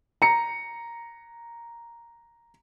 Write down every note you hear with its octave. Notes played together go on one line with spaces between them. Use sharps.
A#5 C#7